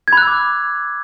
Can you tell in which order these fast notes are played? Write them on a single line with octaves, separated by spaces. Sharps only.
G#6 B5 F#6 E6 D6